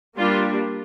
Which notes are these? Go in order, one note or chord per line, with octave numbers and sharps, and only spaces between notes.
G3 A#3 D4 F4